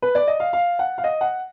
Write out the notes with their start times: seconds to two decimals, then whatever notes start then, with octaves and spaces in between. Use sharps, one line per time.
0.02 B4
0.15 D5
0.27 D#5
0.40 F5
0.53 F5
0.79 F#5
0.98 F5
1.04 D#5
1.21 F#5